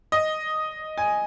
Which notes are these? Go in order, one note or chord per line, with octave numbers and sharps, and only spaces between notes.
D#5
G#5